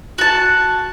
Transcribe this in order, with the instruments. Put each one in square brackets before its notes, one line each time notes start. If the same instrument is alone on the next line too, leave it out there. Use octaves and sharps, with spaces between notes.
[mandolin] F#4 A5